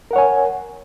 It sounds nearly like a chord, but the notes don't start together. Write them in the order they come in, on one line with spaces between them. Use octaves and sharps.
A#4 F#5 C#5 G#5